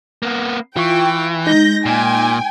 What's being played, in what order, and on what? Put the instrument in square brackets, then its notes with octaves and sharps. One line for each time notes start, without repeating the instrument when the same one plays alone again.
[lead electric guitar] A#3 B3
[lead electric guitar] E3 [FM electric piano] F4 C#6 [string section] G5
[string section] G#3 G6 A#6 [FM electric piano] D#4
[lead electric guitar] A#2 [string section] G5 G#5